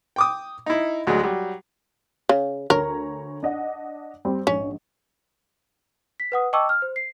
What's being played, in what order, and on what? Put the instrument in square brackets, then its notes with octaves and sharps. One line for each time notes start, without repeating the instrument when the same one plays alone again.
[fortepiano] G5 D6 D#6
D#4 E4
D2 F#3 G#3
F#3 G3
[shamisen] C#3
[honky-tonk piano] D2 C#5 A#5 [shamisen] A#4
[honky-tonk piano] D4 D#5 F#5
G3 C4
[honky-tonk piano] A#1 G#2 [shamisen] C#4
[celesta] B6
B4 F#5 D#6
D#5 G5 A5 C#6 D6 E6
F6
C5
C7